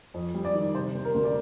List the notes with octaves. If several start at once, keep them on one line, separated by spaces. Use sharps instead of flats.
F2
G3
D5
D#3
C3 C5
C3
A#4
D2
D5